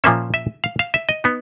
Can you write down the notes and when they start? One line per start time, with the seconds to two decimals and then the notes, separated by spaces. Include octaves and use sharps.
0.04 A#2 F3 A#3 C#4 E5
0.34 E5
0.64 F5
0.79 F5
0.94 E5
1.09 D#5
1.24 B3 D#4